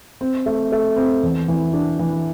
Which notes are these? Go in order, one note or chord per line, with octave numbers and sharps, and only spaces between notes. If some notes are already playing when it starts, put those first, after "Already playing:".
C4
A3
A3
C4
E2
E3
D4
E3